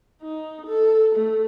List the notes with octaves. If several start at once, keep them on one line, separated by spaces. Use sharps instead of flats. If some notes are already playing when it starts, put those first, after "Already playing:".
D#4
A4
A3